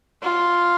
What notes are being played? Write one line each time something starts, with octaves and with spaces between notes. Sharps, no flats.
F4